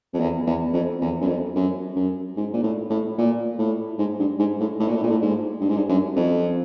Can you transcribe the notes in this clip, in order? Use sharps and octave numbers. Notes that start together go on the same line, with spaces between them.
F2
E2
E2
F2
E2
F#2
F2
F#2
F#2
G#2
A#2
A2
A2
A#2
A2
G#2
G2
G#2
A2
A2
A#2
A2
A#2
A2
G#2
G2
G#2
G2
F#2
F2